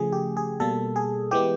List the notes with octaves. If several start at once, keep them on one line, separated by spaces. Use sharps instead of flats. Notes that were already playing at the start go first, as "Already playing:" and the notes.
Already playing: C#3 F3 A3 G#4
G4
G#4
B2 G3 A#3 A4
G#4
E3 G#3 B3 G4